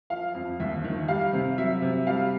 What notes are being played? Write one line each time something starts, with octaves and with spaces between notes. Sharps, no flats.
F3 F5
F2
D#2 E5
D#3
G3 F5
C3
F#3 E5
C3
G3 F5